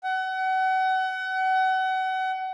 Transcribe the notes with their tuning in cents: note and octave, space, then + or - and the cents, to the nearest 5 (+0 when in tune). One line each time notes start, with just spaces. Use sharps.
F#5 +30